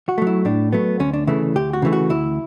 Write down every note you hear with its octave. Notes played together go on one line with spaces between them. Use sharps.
F#4
F#3 A3
E4
A2 D4
F#3 A3 B3
D2 C#4
D4
C#3 E3 A3 E4
D2 G4
F#4
C#3 E3 A3
F#4
D2 E4